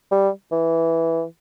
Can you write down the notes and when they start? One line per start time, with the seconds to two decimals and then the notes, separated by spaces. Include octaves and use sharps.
0.12 G3
0.52 E3